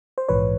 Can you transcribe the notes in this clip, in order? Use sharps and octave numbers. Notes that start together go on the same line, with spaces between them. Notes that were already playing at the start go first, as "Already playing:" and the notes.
C5
A#1 G#2 E3 B4 C#5